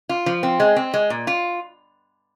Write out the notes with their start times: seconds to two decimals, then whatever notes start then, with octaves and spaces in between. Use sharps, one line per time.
0.09 F4
0.26 F3
0.43 C4
0.60 G#3
0.76 C4
0.94 G#3
1.10 A#2
1.27 F4